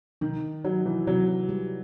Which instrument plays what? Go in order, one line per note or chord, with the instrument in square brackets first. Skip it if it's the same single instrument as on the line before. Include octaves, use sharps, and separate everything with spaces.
[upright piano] D#3 [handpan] D#4
[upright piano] F#3 [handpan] D#4
[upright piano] E3
[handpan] C3 [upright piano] F#3
[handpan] G3